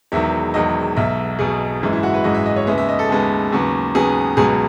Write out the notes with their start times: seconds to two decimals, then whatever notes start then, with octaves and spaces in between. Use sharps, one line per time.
0.12 E1 E2 D#3 F#3 E5
0.54 E1 E2 D#3 F#3 D#5
0.96 B1 B2 F#3 E5
1.39 B1 B2 F#3 G#4
1.81 G#1 F#2 E3 G#3
1.93 E4
2.03 F#4
2.14 B4
2.24 G#1 F#2 E3 G#3 D#5
2.34 E5
2.46 D#5
2.56 C#5
2.67 D#2 C#3 G#3 B3 E5
2.78 E5
2.89 D#5
2.99 A4
3.09 D#2 C#3 G#3 B3 A4
3.52 D#2 C#3 F#3 B3
3.95 D#2 C#3 F#3 B3 G#4
4.37 C#2 B2 F#3 G#4